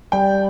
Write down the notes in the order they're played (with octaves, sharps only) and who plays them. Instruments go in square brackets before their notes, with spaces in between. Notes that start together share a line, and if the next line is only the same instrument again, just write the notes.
[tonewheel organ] G3 [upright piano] G5